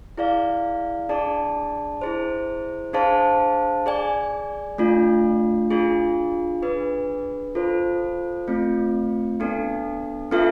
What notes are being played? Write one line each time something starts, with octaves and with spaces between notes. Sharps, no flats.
E4 G#4 D5 F5
D4 G#4 D5 A5
E4 G#4 C5
D4 G#4 C5 F5 A5
G#4 D5 G#5
A3 D4 F4
D4 F4 G#4
D4 G#4 B4
F4 A4 C5
A3 C4 F4
B3 D4 A4
B3 D4 F4 A4 E5